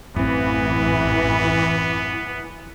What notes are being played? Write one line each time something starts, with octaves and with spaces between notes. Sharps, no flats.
A1 F#2 E3 B3 C4